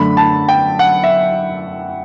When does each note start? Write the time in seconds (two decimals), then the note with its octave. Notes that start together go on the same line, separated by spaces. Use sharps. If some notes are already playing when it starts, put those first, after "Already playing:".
Already playing: F#2 D3 A3 B5
0.17 A5
0.49 G5
0.79 F#5
1.04 E5